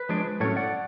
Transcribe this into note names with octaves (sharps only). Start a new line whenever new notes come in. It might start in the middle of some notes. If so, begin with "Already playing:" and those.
Already playing: B4
F3 G#3 D4
A2 F#3 C#4 A4 C#5
D5 F#5